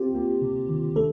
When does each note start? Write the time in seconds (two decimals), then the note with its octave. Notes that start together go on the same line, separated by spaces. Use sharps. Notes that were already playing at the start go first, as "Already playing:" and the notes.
Already playing: C4 F4 G4
0.15 A#3
0.42 C3
0.69 D#3
0.96 A3 D4 A4